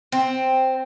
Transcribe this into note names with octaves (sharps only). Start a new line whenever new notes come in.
C4